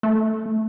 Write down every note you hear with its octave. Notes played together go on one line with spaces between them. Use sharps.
A3